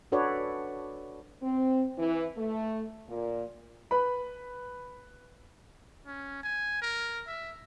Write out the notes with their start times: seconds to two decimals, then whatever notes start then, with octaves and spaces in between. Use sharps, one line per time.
0.12 D4 F#4 A4 B4 C#5 D5
1.43 C4
1.98 E3
2.37 A3
3.09 A#2
3.91 B4 B5
6.06 C#4
6.43 G#5
6.82 A#4
7.27 E5